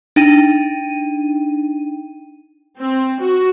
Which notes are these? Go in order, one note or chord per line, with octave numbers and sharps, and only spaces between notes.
D4 D#4 G5 D#7
C4
F#4